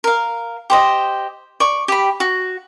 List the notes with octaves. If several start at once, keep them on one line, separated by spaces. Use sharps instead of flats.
A#4 F5
G4 C5 D#5
D5 C#6
G4 B5
F#4